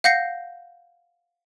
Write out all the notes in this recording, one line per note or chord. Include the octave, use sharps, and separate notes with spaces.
F5 F#5 G6 A#6 C7 C#7